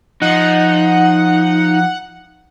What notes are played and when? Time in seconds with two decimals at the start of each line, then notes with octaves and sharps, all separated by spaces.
0.22 F3 D#4 F#5